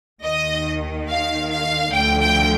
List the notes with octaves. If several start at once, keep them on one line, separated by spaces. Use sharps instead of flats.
D#2 D#3 D#5
F5
F5
D2 D3 F3 G5
G5